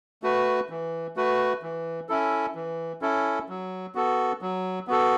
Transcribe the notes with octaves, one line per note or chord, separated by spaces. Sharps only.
A3 F#4 B4
E3
A3 F#4 B4
E3
C#4 E4 A4
E3
C#4 E4 A4
F#3
B3 F#4 A4
F#3
B3 F#4 A4